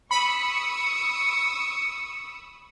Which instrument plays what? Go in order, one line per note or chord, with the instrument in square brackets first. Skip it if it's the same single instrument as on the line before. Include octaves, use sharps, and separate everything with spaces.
[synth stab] B5 [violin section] C#6 D#6 E6 [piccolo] C#7